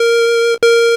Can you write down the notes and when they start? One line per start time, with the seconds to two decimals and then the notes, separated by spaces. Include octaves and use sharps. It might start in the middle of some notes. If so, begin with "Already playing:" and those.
Already playing: A#4
0.62 A#4